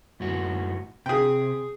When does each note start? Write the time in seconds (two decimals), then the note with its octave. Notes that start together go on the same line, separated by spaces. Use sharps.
0.20 F#2 A2 F#4
1.06 C3 G#4 G5